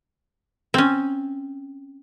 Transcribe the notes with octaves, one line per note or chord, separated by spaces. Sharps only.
C4 C#4